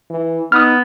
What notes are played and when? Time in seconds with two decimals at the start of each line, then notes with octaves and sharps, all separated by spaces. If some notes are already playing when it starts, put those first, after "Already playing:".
0.10 E3
0.52 B3 D#4 D#6 F6